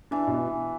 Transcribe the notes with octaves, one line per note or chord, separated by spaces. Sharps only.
E3 D4
B2